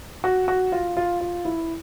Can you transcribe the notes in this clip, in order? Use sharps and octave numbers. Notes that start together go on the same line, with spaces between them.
F#4
F#4
F4
F4
F4
E4